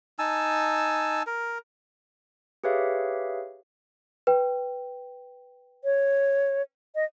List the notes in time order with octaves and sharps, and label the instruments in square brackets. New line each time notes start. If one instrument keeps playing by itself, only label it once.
[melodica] D#4 G#5 A5 E6
A#4
[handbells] G4 G#4 B4 C#5 E5 F5
[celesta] B4 G5
[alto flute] C#5
D#5